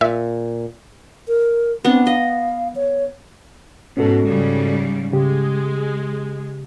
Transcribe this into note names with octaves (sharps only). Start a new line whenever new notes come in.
A#2 E5
A#4
B3 C4 D4
D#5 F5
C#5
G#2 B2 C#4 F#4 A4
G#2 C#3 G3
C#3 G#3 G4